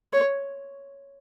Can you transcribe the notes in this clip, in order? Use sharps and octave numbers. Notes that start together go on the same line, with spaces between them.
C#5